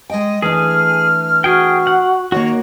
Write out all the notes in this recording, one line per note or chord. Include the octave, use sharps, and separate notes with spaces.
G#3 D#5 G5
E3 A3 D4 G#4 F6
F#4 G#4 G5
F#5
D#3 A#3 F#4 C#5